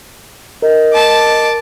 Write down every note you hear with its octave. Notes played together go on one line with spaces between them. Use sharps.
A#4 D#5
A5 D6